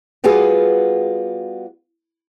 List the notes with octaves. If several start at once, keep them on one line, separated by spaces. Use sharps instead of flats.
G3 B3 F4 F#4 G#4